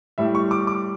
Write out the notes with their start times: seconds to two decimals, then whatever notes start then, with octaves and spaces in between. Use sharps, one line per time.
0.18 A2 G3 E5
0.35 C#6
0.51 D6
0.67 D6